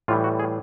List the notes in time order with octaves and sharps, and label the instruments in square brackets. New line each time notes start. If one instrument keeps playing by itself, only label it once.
[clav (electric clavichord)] A2 E3 G3 F4
F#4
G#4